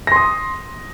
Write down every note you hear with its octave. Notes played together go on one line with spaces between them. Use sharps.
C6 D#6 A#6